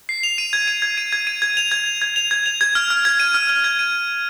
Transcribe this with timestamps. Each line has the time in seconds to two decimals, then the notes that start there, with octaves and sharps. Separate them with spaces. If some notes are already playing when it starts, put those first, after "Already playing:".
0.09 C7
0.23 F7
0.38 D#7
0.53 G#6
0.68 D#7
0.82 G#6
0.98 D#7
1.12 G#6
1.27 D#7
1.42 G#6
1.57 F7
1.72 G#6
1.86 F7
2.02 G#6
2.16 F7
2.31 G#6
2.46 F7
2.61 G#6
2.75 F6
2.90 F6
3.05 G#6
3.20 D#7
3.34 F6
3.49 F6
3.64 G#6
3.79 D#7